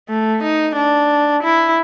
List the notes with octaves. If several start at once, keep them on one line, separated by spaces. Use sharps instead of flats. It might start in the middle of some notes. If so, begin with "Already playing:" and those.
A3
D#4
D4
E4